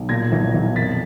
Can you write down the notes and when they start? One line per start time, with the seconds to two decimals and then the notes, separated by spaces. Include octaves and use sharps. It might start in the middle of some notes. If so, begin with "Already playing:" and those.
Already playing: B1
0.09 A#2 G#6 A#6
0.32 B1
0.54 B1
0.76 F2 A6 B6